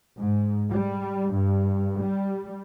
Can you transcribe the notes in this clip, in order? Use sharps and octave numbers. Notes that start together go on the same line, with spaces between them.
G#2
G3
G2
G3